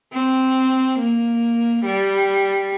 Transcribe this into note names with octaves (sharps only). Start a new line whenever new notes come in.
C4
A#3
G3